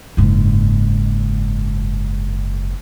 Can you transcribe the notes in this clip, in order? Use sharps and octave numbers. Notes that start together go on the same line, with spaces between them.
F#1 G#2